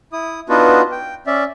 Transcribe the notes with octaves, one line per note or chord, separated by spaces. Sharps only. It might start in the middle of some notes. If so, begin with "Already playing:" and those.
E4 D#6
B3 D4 D#4 F4 F#4 B4
G5
C#4 D5 E5